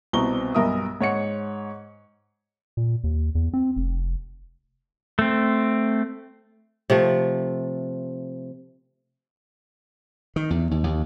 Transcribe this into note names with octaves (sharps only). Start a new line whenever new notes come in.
C2 B2 C4 A#5 C#6 G7
B1 G2 A#4 E5 D#6
G#2 C#5 F#5 C#7
A#2
D#2
E2
C4
F1
A3 C4
C3 F3 A3
D#3
E2
D#2
D#2